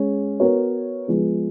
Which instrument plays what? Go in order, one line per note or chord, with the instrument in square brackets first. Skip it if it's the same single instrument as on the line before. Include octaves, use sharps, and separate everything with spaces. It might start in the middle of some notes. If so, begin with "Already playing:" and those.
Already playing: [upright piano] G#3 C#4 G#4
B3 F#4 A#4 C#5
F3 G#3 B3